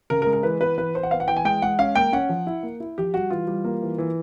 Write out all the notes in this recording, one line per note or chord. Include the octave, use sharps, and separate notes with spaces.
C#3 A#4
A#4
G#3
A#4
E3 B4
B3 B4
E3 B4
E3 C5
F#5
B3 F5
F#5
E3 G5
G#5
G#3 G5
G#3 F#5
C#4 F5
A#3 G5
C#4 F#5
F3
E4
A#3
E4
F3 G4
G3 F#4
E3 F4
G3
A#3
E3
E3